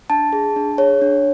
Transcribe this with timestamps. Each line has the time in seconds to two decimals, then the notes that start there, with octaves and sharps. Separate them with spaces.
0.10 D4 A5
0.33 G#4
0.56 D4
0.78 G#4 C#5
1.02 D4